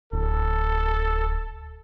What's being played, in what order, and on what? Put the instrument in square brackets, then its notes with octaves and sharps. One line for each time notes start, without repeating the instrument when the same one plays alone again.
[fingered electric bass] D1 [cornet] A4